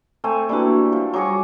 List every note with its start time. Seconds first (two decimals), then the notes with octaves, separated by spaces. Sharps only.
0.24 A3 C4 G#5
0.49 E3 G3 A#3 D4 F#4
0.92 F3
1.14 F#3 G3 G#4 C#6 D6